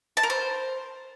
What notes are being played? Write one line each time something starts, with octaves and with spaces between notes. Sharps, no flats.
A5
A#4
C5